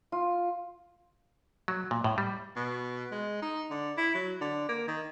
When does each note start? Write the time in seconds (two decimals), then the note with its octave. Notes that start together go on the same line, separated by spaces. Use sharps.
0.12 F4
1.68 F#3
1.91 A#2
2.04 A2
2.18 G3
2.56 B2
3.11 G#3
3.42 D#4
3.70 D3
3.97 E4
4.15 F#3
4.41 D3
4.69 A#3
4.88 D#3